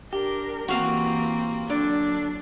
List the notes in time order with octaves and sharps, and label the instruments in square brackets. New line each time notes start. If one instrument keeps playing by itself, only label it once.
[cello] D4 A#4 [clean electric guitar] G4
[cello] E3 [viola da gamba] A#3 C4 [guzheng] F#4 F5
[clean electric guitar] D3 [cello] F#3 D4 [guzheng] D5